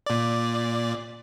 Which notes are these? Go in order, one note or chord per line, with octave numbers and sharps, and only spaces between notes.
A#2 D5